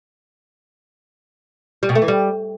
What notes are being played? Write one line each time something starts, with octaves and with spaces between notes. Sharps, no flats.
G3
B2
A3
E3
G3